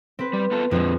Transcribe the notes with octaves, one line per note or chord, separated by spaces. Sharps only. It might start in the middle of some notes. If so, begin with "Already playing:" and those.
C4 B4
G3
B3 F4 A4
F2 A#2 D3 G#3 C4